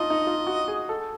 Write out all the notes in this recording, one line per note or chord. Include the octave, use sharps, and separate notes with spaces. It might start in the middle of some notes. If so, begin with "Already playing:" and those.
Already playing: D4 D#4 F4 D#5
D#4
F4
F#4
G#4
A4